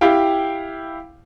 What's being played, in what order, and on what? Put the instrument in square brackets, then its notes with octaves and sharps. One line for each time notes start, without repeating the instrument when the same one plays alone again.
[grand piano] E4 G4 F5 G5